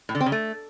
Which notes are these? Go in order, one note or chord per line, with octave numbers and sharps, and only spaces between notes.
A2
D3
C4
C#3
A3